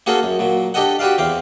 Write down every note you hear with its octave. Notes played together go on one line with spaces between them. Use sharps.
A#3 C#4 F#4 G#4 A4
F#2
A#2 F#3
D4 G4 A4 D#5 F#5
F#4 G4 B4 D5 F5
E2 C4 F5 D6